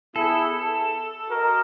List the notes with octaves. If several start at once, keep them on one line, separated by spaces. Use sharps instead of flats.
B3 E4 G#4 A4
F#4 A#4 D#5